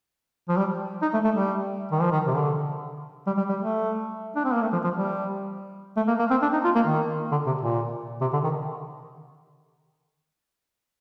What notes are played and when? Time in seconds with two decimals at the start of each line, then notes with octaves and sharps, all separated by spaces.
0.49 F3
0.57 G3
1.02 D#4
1.14 A3
1.25 A3
1.35 G3
1.92 D#3
2.02 F3
2.11 D#3
2.27 C3
2.37 D3
3.27 G3
3.38 G3
3.49 G3
3.60 A3
4.36 D4
4.45 C4
4.53 A#3
4.62 A3
4.73 F3
4.84 F3
4.95 G3
5.97 A3
6.08 A#3
6.19 A#3
6.31 C4
6.42 D4
6.53 D#4
6.64 F4
6.75 A#3
6.87 D#3
7.32 D3
7.47 C3
7.62 A#2
8.21 C3
8.33 D3
8.44 D#3